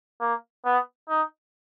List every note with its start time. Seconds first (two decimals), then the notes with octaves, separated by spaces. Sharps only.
0.21 A#3
0.65 B3
1.09 D#4